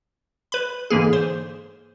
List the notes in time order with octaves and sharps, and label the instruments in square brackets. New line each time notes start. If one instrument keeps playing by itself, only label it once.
[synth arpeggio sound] B4 B5
G#2 D3 E3 A#3 G#4
C5